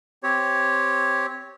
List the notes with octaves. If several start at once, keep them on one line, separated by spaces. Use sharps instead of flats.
C4 G4 C#5